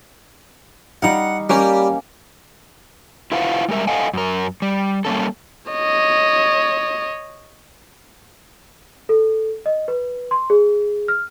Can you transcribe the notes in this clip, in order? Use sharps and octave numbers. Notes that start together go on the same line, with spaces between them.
G3 D#4 F5 F#5
G3 A#3 C#4 G4
E4 F4 B4 C5 F5 F#5
G3 G#3 A#4 E5
A4 D#5 F5 F#5 G#5
F#2 A#4
G3
G3 A#3 C#4 A4
C#5 D#5
A4
D#5
B4
C6
G#4
F6